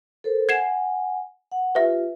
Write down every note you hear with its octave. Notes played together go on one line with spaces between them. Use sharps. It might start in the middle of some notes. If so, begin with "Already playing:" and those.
A4 A#4 C5
F#5 G#5 G#6 C7 E7
F#5
F4 G4 B4 E5